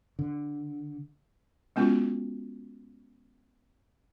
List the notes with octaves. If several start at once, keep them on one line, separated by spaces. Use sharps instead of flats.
D3
G#3 B3 C#4 F4 F#4